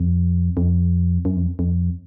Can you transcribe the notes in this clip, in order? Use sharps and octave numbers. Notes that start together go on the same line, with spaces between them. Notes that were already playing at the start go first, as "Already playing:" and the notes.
Already playing: F2
F2
F#2
F2
F2